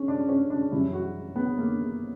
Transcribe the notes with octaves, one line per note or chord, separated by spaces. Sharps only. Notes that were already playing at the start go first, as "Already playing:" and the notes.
Already playing: D3 C#4
D4
C#4
D4
F#2 E3 G3 E4
F#4
B3
A#3